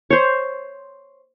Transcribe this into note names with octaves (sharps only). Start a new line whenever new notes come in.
C5 C#5